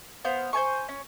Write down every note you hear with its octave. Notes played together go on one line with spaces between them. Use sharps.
B3 C5 F5
C5 C#5 G#5 C#6
C#4